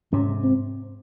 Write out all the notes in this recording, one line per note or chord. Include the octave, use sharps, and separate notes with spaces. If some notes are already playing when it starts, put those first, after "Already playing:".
G#2 C3 C#4
C4